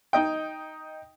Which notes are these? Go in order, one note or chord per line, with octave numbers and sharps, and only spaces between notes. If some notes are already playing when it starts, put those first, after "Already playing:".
D#4 D#5 G5